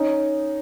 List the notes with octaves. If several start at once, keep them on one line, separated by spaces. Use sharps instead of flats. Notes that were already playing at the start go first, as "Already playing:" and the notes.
Already playing: C#4 D#4